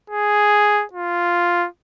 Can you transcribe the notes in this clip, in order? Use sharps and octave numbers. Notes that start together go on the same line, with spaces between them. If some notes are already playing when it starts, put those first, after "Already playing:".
G#4
F4